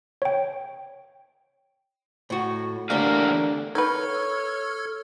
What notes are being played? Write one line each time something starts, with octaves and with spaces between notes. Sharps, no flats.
C#5 G5
A2 F#4
E2 D3 A3 G4 A#4 F5
D#4 A4 B4 C#5 F6 G#6